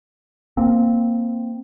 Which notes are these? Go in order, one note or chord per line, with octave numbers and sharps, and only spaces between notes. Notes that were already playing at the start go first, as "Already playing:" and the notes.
A#3 C4